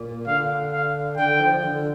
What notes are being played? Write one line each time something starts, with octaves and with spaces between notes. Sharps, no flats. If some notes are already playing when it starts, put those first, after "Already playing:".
Already playing: A#2
D3 F5
F5
D3 G5
F3
D3